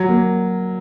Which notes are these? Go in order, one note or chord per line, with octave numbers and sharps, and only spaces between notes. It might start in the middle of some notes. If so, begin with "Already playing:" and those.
Already playing: F#3
A#3